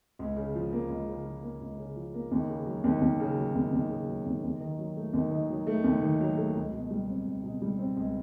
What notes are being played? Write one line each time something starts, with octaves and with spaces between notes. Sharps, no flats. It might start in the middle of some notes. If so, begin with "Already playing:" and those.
C#2
C#3
F3
A#3
C#2
C#3
F3
A#3
C#2
C#3
F3
A#3
D#2
C#3
F#3
D#2
D#2
C#3
F#3
D#2
D#2
C#3
F#3
D#2
D#2
D#3
F#3
A3
D#2
D#3
F#3
A3
D#2
D#3
F#3
A3
C#2
B2
G3
C4
C#2
B2
G3
C4
C#2